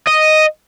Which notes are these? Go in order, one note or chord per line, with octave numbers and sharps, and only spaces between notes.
D#5